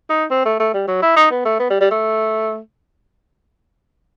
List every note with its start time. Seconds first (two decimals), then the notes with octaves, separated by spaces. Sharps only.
0.10 D#4
0.31 C4
0.45 A3
0.60 A3
0.74 G3
0.88 F#3
1.02 E4
1.16 D#4
1.31 B3
1.45 A3
1.59 B3
1.70 G3
1.81 G3
1.91 A3